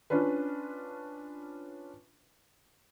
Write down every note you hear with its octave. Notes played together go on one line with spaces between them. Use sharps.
C#4 D4 F4 B4